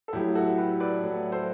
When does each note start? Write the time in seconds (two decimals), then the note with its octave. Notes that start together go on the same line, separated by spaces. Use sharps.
0.08 A4
0.13 A2 F#3 A3 E4 G4
0.35 F#4 A4
0.58 G4 B4
0.80 B4 D5
1.02 A2 F#3 A3
1.32 A4 C5